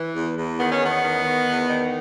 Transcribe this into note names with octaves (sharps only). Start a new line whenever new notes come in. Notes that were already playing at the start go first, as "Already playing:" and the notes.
Already playing: E3
E2
E2
D#3 B3
C#4
E2 B3
D#3
D#3
E2
D#3